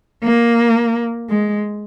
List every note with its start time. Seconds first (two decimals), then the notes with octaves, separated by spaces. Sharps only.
0.24 A#3
1.30 G#3